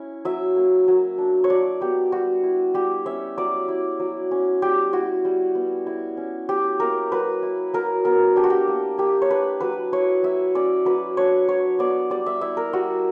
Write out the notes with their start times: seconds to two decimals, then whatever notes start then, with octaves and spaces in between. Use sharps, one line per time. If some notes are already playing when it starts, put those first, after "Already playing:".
Already playing: C#4 E4
0.25 F#3 E5
0.56 A#3
0.88 F#3
1.18 D4
1.44 C#5
1.50 F#3 D5
1.81 B3 G4
2.12 G3 F#4
2.43 E4
2.74 G3 G4
3.06 C#4 E5
3.38 F#3 D5
3.68 E4
4.00 F#3
4.31 C#4
4.62 G3 G4
4.93 E4 F#4
5.25 G3
5.55 B3
5.87 E4
6.17 C#4
6.49 F#3 G4
6.80 A#3 A#4
7.12 F#3 B4
7.43 E4
7.74 F#3 A#4
8.05 B3 A#4
8.36 D4 G4
8.44 F#4
8.50 G4
8.68 A#3
8.98 A#3 G4
9.22 C#5
9.29 D4 B4
9.61 F#3 B4
9.92 E4 C#5
10.23 F#3 E5
10.55 C#4 D5
10.85 F#3 B4
11.17 D4 C#5
11.48 F#3 C#5
11.79 B3 D5
12.10 G3 D5
12.26 E5
12.41 E4 E5
12.57 A#4
12.73 G3 F#4